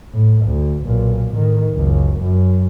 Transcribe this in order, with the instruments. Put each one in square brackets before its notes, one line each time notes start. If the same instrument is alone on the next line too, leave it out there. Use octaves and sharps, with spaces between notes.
[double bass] A2
D2
B1 A#2
A2 D#3
F#1 C#2
F#2